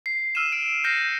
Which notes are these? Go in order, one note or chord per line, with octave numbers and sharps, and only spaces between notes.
C7
E6 F6 D#7 E7
D7
F6 G6 A#6 C7 C#7